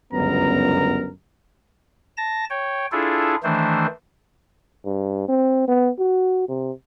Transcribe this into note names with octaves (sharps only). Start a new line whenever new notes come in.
G1 C#2 F#2 B3 A#4 A#5
A5 A#6
C#5 G5
D4 E4 F4 G#4 A4
D#3 E3 A3 D4 C5
G2
C4
B3
F#4
C3